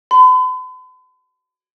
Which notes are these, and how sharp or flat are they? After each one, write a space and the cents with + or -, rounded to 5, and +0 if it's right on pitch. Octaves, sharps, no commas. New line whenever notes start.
B5 +45